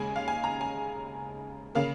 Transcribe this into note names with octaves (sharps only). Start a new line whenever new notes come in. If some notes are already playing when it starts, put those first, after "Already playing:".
Already playing: D#2 C#3 G#3 G#5
F5
G#5
A#5
G#5
C#3 A#3 F5